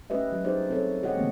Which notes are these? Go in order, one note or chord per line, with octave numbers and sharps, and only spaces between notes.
A3 C#4 G4 B4 D#5 E5
F#3 G3 C#4 G4
G3 D#4 G4 G#4 C5 D5
C4 A4 C#5
G4 C#5 D#5 F#5
B2 D#3 E3 A3 A#3 C4